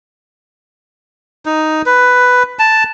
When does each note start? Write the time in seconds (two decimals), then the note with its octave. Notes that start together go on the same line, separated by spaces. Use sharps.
1.46 D#4
1.86 B4
2.59 A5